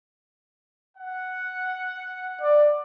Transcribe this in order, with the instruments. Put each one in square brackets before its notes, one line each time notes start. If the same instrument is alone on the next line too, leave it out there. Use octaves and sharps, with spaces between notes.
[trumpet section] F#5
[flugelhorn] D5